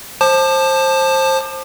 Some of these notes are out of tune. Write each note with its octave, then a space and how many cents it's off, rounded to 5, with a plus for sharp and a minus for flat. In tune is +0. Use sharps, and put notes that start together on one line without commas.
C5 +20 A5 +0 D6 +40